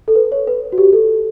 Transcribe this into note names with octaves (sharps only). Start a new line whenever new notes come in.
A4
B4
C#5
B4
F#4
G4
A4